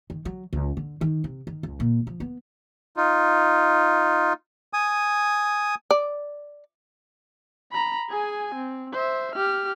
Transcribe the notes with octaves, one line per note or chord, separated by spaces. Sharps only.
D#3
F#3
C#2
D3
D#3
C3
D#3
C#2
A#2
F3
B3
D#4 F4
G#5 D#6
D5
A#5 B5
G#4 G#5
C4
C5 E5
G4 F6